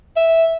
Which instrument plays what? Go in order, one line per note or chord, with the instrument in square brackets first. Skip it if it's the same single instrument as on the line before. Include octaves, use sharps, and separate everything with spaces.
[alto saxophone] E5